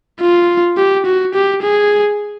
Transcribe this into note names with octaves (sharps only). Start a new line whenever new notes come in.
F4
G4
F#4
G4
G#4